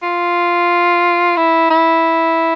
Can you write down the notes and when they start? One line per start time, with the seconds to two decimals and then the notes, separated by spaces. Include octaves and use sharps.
0.02 F4
1.37 E4
1.70 E4